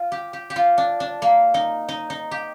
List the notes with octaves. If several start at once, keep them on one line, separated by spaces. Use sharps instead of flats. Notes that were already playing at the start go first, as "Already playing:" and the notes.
Already playing: F4
G4
G4
G4
F4
D4
D4
A#3
D#4
D#4
D#4
G4